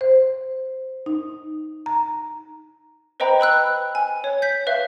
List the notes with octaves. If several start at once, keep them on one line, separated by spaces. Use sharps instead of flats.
C5
D#4
A#5
B4 C5 D#5 G5 A#5 B5
B4 B5 E6 F#6
G#5
C#5
G6 B6
B4 E5 F5